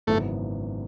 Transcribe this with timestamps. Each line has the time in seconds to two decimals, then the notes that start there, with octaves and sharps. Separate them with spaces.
0.07 G#1 F#2 C#3 E3 A3 B3